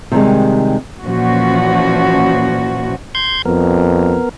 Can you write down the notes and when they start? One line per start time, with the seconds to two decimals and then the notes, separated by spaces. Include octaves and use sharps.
0.12 C3 D#3 G3 G#3
1.03 A#2 E3 F3 C#4 F#4
3.15 C6 G6 G#6
3.46 F2 B3 A#4